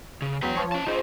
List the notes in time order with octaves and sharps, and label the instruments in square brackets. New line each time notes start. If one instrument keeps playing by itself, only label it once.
[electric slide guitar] C#3
[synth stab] E2 F#3 B6 [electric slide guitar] B4 G5
[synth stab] F3 C#5
[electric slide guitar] C#4 A5
[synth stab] D#4 C5 [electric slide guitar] F4 G#4